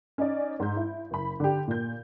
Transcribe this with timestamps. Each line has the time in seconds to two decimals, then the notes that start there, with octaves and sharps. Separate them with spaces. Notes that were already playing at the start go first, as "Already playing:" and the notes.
0.18 C#4 D#4 D5
0.60 G#2 G6
0.76 E4
1.11 F#1 B5
1.40 D3 G4
1.68 A#2 G6